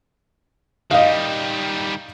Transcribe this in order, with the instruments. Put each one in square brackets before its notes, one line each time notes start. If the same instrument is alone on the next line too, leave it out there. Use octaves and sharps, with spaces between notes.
[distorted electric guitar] D#3 G3 [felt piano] D#5 F5